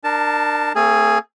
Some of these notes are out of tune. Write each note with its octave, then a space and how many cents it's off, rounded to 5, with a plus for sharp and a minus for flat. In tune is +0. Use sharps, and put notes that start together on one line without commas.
D4 +30 A#4 -10 A5 +0
A3 +45 C4 +0 G#4 +0